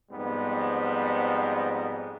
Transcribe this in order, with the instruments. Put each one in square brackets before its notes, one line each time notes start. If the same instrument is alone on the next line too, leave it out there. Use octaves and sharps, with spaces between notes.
[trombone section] F2 G#2 G3 B3